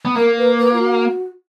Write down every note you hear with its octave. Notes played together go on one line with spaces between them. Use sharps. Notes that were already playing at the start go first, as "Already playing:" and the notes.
B3
A#3 A#4
B4
B4
F4
F#4